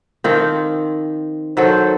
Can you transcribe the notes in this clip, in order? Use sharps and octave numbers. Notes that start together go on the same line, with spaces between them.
D#3 F3 C4
D#3 F#3 A4 C5